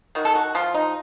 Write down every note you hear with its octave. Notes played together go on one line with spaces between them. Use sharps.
D#3 F#4
A4
F#4
F3 F4
D#4